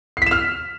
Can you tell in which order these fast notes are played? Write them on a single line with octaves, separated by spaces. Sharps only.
C7 B6 E7 F6